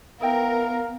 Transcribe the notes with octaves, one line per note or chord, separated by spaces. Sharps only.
B3 D#4 E4 A#4 F5 G5